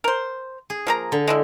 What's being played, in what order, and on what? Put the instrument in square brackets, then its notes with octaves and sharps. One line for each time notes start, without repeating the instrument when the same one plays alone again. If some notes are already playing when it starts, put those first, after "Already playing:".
[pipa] A#4 C5
[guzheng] G#4
[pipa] F3 A#3 A#5
[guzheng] D3
[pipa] G#3 D4 E4